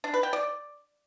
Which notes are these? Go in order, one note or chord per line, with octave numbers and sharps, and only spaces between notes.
D4
B4
G5
D5